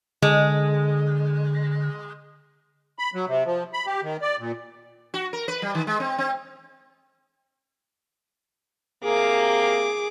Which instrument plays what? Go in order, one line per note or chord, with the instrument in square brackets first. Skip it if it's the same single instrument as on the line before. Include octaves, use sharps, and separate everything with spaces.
[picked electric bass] D3 [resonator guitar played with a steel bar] G#3
[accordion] B5
F#3
C3
F3
B5
G4
D#3
D5
A#2
[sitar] F#4
A#4
B4
G3
D#3
G#3
C4
C4
[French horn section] C3 A#3 [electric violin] G#4 D6